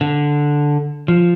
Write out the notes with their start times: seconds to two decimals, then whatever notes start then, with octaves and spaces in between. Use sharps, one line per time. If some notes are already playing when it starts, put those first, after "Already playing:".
0.01 D3
1.08 F3